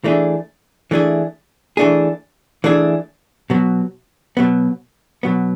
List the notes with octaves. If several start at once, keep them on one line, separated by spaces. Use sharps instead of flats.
E3 A3 D4 G#4
E3 A3 D4 G#4
E3 A3 D4 G#4
E3 A3 D4 G#4
B2 F#3 B3
B2 F#3 B3
B2 F#3 B3